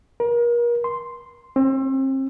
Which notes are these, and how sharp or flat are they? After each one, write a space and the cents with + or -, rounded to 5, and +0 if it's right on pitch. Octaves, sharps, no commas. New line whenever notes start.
A#4 +35
C6 -5
C4 +35